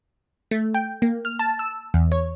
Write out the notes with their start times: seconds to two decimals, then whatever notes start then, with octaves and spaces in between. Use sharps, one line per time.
0.51 A3
0.74 G5
1.02 A#3
1.25 F6
1.39 A5
1.59 E6
1.94 E2
2.12 C#5